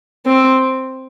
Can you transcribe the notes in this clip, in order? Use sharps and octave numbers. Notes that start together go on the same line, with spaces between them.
C4